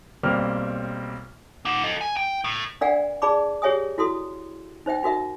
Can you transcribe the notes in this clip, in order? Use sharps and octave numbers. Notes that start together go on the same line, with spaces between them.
B1 G3 A#3 C4 F6
A#3 F#5
A4 D#5
G#5
G5
A2
D4 A#4 D5 F5 F#5 G#5
G#4 D5 A5 B5 D6
G4 G#4 C#5 E5 G#5 D#6
E4 F#4 A4 C6 D#6
D#4 C5 E5 G5
D#4 F#4 A#4 E5